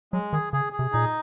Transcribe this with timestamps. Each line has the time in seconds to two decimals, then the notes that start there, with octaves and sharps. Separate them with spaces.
0.13 F#3 G#3
0.33 D#3 G#4
0.53 C#3 G#4
0.73 G#4
0.79 C3
0.92 A#2 D#4